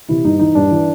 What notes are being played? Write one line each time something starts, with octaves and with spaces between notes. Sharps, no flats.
C3 E3 E4
G2 D#4
E3 D#4
G2 D4
E3